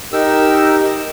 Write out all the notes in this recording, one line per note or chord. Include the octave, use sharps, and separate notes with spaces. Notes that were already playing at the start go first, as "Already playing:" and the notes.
D#4 G4 A#4 E6